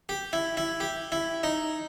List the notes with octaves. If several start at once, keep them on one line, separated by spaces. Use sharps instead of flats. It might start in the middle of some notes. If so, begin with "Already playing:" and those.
G4
E4
E4
G4
E4
D#4